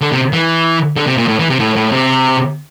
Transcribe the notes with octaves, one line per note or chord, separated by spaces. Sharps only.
D3
C3
E3
D3
C3
A#2
A2
E3
C3
A2
A2
C3